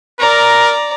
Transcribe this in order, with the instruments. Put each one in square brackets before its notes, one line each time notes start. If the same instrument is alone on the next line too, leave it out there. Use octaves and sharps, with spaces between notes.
[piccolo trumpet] A#4 [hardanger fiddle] D5 A#5